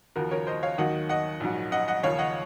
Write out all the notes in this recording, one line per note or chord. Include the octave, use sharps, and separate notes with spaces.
D#2 C#3 F3 F#4 A#4
A#4 C#5
C5 D#5
C#5 F5
D#2 D#3 F#3 D#5 F#5
D#5 F#5
A#1 G#2 F#3
D#5 F#5
D#5 F#5
D#2 C#3 F3 C#5 F5
D#5 F#5